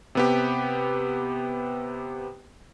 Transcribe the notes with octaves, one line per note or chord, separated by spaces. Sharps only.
C3 B3 G4